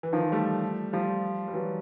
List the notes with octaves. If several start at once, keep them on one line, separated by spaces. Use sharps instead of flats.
E3
D#3 F3
G3 A3
F3 G3
G3
E3 F#3